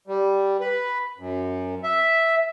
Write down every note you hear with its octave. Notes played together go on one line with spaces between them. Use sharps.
G3
B4
F#2
E5